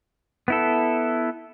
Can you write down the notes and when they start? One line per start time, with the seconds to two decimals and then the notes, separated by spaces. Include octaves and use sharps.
0.48 B3 E4 A4